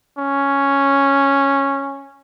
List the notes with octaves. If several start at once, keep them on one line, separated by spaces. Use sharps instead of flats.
C#4